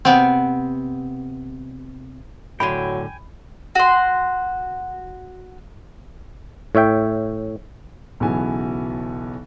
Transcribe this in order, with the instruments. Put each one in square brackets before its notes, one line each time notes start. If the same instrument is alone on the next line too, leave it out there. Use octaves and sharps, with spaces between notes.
[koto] C3 B3 C4
[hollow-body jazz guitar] A2 D3 C6 [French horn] F#3 [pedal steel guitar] G5 G#5 [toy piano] B5
[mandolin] F#4 C6
[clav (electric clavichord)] A2 C#5 E5 G5
[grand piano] B1 C#3 E3 F#3 B3 G#5